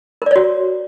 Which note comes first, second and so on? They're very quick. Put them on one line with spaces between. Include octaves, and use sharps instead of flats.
A#4 D5 C#5 F#4